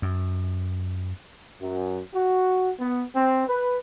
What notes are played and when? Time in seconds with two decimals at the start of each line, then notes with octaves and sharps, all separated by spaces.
0.02 F#2
1.62 F#2
2.15 F#4
2.79 B3
3.16 C4
3.48 B4